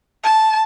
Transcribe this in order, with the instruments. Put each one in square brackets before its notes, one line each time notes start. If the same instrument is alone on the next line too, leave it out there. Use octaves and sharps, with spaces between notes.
[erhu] A5